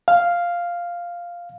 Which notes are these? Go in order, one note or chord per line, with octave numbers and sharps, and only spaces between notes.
F5